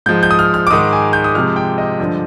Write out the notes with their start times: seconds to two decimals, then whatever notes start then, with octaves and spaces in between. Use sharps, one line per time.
0.06 G#2 F3 G#3 G6
0.23 G6
0.31 D#6
0.39 F6
0.54 F6
0.67 D6
0.70 G#2 D#3 G#3 D#6
0.93 G#5
1.13 G6
1.24 D#6
1.34 C3 F3 G#3 F6
1.56 G5
1.78 D#5
1.99 G2 D3 F3 G#3